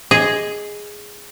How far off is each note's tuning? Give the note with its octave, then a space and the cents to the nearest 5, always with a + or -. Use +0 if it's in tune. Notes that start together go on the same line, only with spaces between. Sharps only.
G#4 +0 D#5 +0